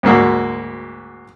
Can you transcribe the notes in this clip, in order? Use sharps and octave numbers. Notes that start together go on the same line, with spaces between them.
D2 G#2 A#3 F#4